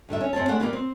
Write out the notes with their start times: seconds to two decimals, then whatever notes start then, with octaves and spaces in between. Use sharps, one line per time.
0.09 G2 D3 D#4 E5
0.21 C#4
0.33 F#2 C4 C#5 A5
0.48 G#3 A3 C4 D4 F#5
0.60 G3 A#3 B3 F4 G#4 B4
0.73 C4